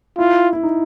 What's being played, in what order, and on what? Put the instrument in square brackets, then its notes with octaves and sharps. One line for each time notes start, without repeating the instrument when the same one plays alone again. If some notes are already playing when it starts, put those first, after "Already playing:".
[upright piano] E4 [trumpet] F4
[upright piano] E4
D#4